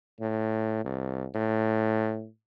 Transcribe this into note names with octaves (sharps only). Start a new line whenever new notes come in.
A2
C2
A2